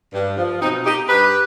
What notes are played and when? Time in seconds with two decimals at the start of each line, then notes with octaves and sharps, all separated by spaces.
0.13 G2
0.37 F3
0.61 B2 C4 D#4
0.85 D#4 G4
1.09 G2 G4 B4